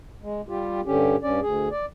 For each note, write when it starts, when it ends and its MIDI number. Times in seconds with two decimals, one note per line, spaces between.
0.22 0.41 56
0.48 0.81 55
0.48 0.81 65
0.48 0.81 67
0.86 1.16 43
0.86 1.16 50
0.86 1.16 61
0.86 1.16 67
1.23 1.40 43
1.23 1.40 61
1.23 1.40 74
1.41 1.69 38
1.41 1.69 68
1.71 1.86 74